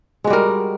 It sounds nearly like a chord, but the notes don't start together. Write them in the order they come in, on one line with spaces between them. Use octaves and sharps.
G#3 F#4 G3 A#4